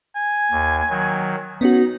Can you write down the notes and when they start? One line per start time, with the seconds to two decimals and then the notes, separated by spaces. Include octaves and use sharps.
0.16 G#5
0.51 D#2 G#6
0.90 D#3 F#3
1.61 B3 C#4 D#4 F#4